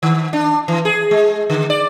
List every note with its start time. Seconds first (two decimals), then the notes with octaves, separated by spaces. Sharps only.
0.03 D#3
0.33 D4
0.68 E3
0.85 G#4
1.11 G#3
1.50 D3
1.70 D5